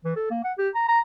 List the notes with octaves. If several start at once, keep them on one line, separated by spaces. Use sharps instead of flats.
E3
A4
A#3
F#5
G4
A#5
A#5